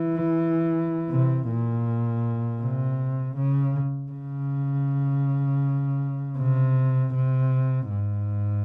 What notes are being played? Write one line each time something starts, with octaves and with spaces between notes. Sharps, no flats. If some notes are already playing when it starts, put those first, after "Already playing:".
Already playing: E3
C3
A#2
C3
C#3
C#3
C3
C3
G#2